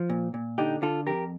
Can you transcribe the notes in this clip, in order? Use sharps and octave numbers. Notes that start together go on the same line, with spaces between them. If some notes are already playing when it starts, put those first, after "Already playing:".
Already playing: F3
A#2
A#2
D3 D#4 G4
D3 F4 A4
F2 G4 A#4